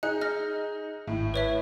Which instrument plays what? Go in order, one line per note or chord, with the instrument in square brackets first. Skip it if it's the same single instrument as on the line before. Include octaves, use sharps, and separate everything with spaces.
[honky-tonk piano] D#4 [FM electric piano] G#4 [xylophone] F#6
[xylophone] F6 A#6
[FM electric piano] G#1 [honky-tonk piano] A2
[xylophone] B4 C#5 E5